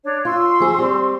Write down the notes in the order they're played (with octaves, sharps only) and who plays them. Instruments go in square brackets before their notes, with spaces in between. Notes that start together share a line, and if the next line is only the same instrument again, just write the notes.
[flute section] D4 C#5
[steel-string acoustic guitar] F4 [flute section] C6 C#6 E6
[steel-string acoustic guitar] F3 G#4
G3 C4 G4